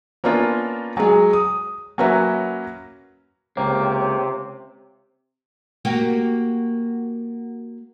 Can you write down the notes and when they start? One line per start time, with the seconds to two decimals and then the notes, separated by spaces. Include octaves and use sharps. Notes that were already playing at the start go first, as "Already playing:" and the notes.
0.24 A#3 B3 C#4 D4 F4
0.97 F#3 G#3
1.33 D#6
1.98 F#3 A#3 C#4 F#4 B4 E5
3.57 C#2 C3 A#3 C5 C#5 G5
5.85 A#3 F#4 G4